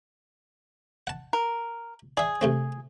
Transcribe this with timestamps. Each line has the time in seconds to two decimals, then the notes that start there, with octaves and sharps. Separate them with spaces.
1.07 F#5 A5
1.33 A#4
2.17 G#4 D5 E5
2.41 C3 A3 C4